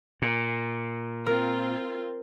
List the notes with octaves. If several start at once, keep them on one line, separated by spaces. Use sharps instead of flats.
A#2
C4 F4 A#4